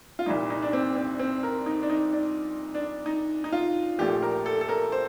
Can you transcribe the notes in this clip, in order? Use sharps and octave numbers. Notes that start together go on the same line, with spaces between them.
F4
C2 A#2 G3 D#4
D#4
D4
C4
C4
C4
A#4
D#4
D4
D#4
D4
D4
D#4
D#4
F4
A#1 A#2 F3 A3 G4
A#4
A4
A4
A#4
C5